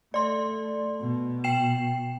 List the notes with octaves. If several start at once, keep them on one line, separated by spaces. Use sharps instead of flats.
A3 D5 C6
B2
G5 C7 E7